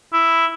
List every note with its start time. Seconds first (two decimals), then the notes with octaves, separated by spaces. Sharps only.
0.13 E4